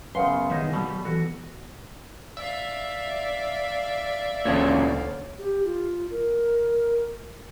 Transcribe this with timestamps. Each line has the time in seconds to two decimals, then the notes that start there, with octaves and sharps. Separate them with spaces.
0.15 F#2 C#3 B3 B4 F5 C6 C#7
0.50 D#3 G3 D#4 G#4 E5
0.73 B2 F#3 G3 A#3 E6
1.05 E3 B3 F#4 A4
2.37 D5 E5 F5
4.45 D2 A#2 C#3 C#5
5.39 G4
5.65 F4
6.11 A#4